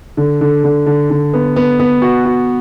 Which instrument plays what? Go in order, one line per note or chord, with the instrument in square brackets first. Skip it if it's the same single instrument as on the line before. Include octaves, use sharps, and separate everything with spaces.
[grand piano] D3
D3
D3
D3
D3
B3
B3
B3
F#4
F#4